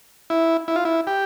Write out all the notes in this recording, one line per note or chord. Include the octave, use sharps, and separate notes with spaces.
E4
E4
F4
E4
G4